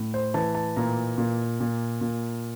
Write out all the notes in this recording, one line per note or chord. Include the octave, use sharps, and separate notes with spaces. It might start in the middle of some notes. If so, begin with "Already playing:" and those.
Already playing: A2
C5
E3 A5
A5
A#2 A#5
A#2
A#2
A#2